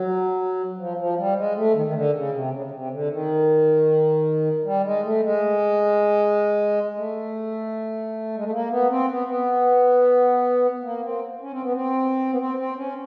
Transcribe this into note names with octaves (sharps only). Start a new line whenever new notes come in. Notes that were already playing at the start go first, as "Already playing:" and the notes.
Already playing: F#3
F3
F3
G3
G#3
A3
D#3
D#3
D3
C#3
C3
C#3
C#3
C3
D3
D#3
G3
G#3
A3
G#3
A3
G#3
A3
A#3
B3
C4
B3
B3
A#3
C4
C#4
C4
B3
C4
B3
C4
C4
C#4